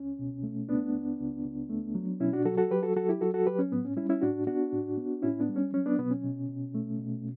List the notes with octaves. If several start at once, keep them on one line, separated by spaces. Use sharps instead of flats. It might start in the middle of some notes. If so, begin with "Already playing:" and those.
Already playing: C#2 C#4
B2
A3
C#2 B3 D4
C#2
C#2
C#2
A3
F#3
B2 C#4 E4
D4 F#4
F#3 F#4 A4
F#4 A4
F#3 G4 B4
F#4 A4
F#3 F#4 A4
E4 G4
F#3 F#4 A4
F#4 A4
F#3 G4 B4
C#4
A2 B3
C#4
G3 C#4 E4
C#4 E4
A2 D4 F#4
B3 D4 F#4
A2
B3
A2 C#4 E4
B3 D4
G3
C#4
F#3 C#4
B3 D4
B2 B3
C#4
B2
B2
A3
B2